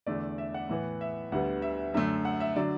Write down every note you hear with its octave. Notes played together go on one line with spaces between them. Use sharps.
E2 D3 A3 D5
E5
F#5
A2 E3 B3
E5
D2 D3 G3 B3 F#5
E5
F#2 D3 A3 E5
F#5
E5
D3 F#3 D5